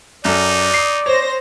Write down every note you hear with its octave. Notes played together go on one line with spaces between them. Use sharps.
F#2 D#4 A4 D5
D#6 C7
C5 C#5 A#6